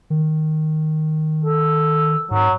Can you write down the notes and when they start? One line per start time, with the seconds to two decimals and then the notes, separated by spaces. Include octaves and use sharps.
0.10 D#3
1.44 A4
2.31 G#2 F#3